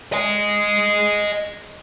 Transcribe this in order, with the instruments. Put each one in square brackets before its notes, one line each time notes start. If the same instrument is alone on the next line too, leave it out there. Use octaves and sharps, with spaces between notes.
[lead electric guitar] D#5 G#5